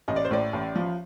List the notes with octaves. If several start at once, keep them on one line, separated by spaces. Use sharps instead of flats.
A1 D#5
D5
C5
A2 D5
A1
F3